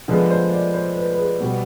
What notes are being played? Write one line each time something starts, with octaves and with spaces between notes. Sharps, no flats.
D3 F3 G#3 B3 F4
C5
D5
C5
B4
B4
G#4
B2 G3 B3